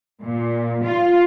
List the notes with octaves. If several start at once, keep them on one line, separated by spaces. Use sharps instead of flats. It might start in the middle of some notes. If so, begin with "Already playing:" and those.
A#2
F4